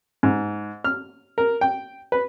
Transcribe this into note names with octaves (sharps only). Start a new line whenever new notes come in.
G#2
F6
A#4
G5
B4